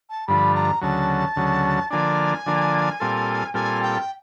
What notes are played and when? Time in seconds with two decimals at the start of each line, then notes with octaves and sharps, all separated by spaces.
0.10 A5
0.27 G2 D3 F3 B5
0.55 A#5
0.81 D2 C#3 F#3 A5
1.36 D2 C#3 F#3
1.90 D3 F3 A#3 D4 G#5
2.46 D3 F3 A#3 D4
3.00 A#2 G3 C4 F4 A4
3.54 A#2 G3 C4 F4 A4 G#5
3.82 G5